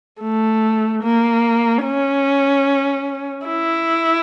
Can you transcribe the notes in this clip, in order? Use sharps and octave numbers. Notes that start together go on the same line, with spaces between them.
A3
A#3
C#4
E4